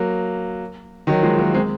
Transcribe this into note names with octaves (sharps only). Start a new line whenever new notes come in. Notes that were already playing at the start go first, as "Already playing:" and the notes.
Already playing: F#3 A#3
D#3 F#3
F3 G#3
F#3 A#3
G#3 C4